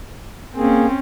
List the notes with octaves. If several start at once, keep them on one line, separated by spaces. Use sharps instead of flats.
A#3 C4 C#4 G#4